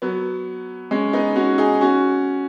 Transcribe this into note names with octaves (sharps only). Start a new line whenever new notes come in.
F#3 B3
G#3 C#4
B3 D#4
C#4 F#4
D#4 G#4
C#4 F#4